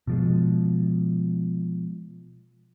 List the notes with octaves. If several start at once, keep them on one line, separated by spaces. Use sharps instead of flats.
B2 F3 G#3